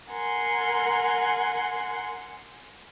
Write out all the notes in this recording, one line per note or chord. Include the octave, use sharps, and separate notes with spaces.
A#4 F#5 G#5 C6